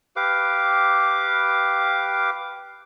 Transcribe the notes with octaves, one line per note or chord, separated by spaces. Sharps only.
G4 B4 F5 D6